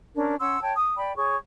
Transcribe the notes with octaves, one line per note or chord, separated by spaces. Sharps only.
C#4 D4 A#4
C#4 F#5 C6 E6
C#5 G5 A5
D#6
D5 G5 B5
G#4 C#5 C#6